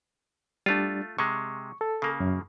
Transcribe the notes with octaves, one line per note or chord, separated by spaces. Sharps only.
G3 A3 D4 F4
C3 G#3 C#6
A4
C#3 A#3
F#2